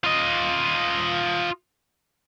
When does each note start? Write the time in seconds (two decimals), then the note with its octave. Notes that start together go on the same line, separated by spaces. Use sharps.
0.04 F4 D#5